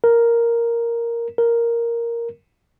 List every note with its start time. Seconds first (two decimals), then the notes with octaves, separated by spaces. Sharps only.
0.04 A#4
1.38 A#4